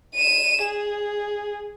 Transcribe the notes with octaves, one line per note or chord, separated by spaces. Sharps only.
D#7 E7
G#4